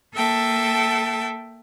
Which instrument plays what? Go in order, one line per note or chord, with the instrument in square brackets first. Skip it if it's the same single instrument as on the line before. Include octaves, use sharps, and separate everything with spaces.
[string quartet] A#3 A4 E5 G5 A5